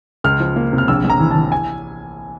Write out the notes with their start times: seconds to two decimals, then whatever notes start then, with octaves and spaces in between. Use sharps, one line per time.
0.24 C#2 F6
0.40 F3
0.56 A#3
0.73 C3
0.78 F6
0.88 A#1 E6
1.04 A#1
1.10 A#5
1.20 E3
1.31 A5
1.36 E3
1.52 G#5